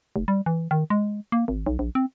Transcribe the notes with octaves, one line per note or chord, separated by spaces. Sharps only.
F1
G3
E3
D#3
G#3
A#3
G#1
B1
A#1
C4